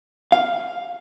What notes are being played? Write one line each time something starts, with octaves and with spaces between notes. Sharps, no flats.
F5